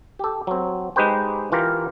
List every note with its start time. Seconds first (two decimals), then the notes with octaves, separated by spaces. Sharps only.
0.19 G4 A4
0.47 F#3 C4
0.96 G#3 D#4 G4 B4 C5 G5
1.52 E3 F4 G4 A#4